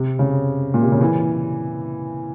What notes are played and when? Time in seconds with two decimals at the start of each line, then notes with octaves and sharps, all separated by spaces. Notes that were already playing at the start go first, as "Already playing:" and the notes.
Already playing: C3
0.19 C#3
0.74 A#2
0.83 C3
0.92 C#3
1.01 E3